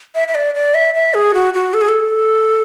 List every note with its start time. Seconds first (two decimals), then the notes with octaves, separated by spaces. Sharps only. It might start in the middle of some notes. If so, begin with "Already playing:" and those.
0.15 E5
0.28 E5
0.35 D5
0.54 D5
0.74 E5
0.94 E5
1.14 G#4
1.34 F#4
1.54 F#4
1.74 A4
1.81 G#4
1.88 A4